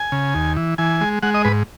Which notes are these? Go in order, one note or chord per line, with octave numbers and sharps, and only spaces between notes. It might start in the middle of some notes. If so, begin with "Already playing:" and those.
Already playing: G#5
C#3
D#2
E3
E3 G#5
G#3
G#3 F#5
D#5
G#2 B4